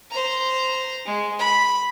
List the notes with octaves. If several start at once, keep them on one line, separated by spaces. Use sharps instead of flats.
C5 A#5
G#3
B5